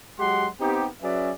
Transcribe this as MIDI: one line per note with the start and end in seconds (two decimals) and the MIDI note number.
0.19 0.47 54
0.19 0.47 56
0.19 0.47 66
0.19 0.47 67
0.19 0.47 78
0.19 0.47 84
0.60 0.86 59
0.60 0.86 60
0.60 0.86 63
0.60 0.86 67
1.02 1.31 54
1.02 1.31 61
1.02 1.31 68
1.02 1.31 71
1.02 1.31 74
1.02 1.31 76